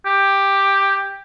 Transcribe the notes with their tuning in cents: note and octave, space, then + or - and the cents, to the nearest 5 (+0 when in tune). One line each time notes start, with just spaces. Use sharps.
G4 +5